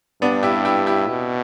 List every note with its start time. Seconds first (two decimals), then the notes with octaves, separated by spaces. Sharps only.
0.21 G2 B3 D4
0.43 E4 G4
0.65 E4 G4
0.87 E4 G4
1.08 B2